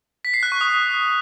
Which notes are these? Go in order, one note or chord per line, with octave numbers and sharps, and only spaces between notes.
B6
C7
F#6
C#6
D#6